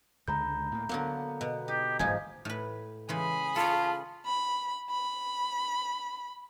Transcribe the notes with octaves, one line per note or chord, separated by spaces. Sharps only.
C#2 D3 G#3 A#5 B5 G6
A2 A#3
D3 F#3 A#3 B3
B2
D#4 G4
D1 G1 G#2 F3 D#4 G#5
A2 B4
C#3 E3 G#3 G#4 B5
F4 A4 C#5 A5
B5
B5